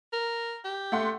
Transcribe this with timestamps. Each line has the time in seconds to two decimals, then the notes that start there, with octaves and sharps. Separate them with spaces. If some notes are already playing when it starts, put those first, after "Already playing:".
0.13 A#4
0.64 G4
0.92 A3 F#5 C6